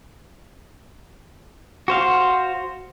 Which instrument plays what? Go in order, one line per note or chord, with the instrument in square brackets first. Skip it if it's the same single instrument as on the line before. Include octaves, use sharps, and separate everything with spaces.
[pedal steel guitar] F#4 C5 F5